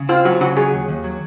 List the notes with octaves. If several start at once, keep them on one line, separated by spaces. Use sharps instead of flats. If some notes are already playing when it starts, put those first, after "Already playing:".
Already playing: C#3
C4 F4
F#3 F#4
C#3 F#4
F#3 G#4
D#2
D#2
F#3